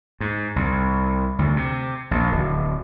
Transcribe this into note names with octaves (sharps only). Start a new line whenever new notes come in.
G#2
C2
D2
C3
A#1
D1